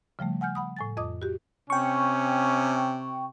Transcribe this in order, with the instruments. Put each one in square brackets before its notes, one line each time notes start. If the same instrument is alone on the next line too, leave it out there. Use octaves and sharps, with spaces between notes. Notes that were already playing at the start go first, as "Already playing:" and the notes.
[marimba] C#3 F3 G3 A3
F#5 G#5 F6 G6
F#5 B5 D#6
A2 G#5 A6
F2 D#5 D6 D#6
F#4 G4
[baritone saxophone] C3 [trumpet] C#4 [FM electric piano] G5 C#6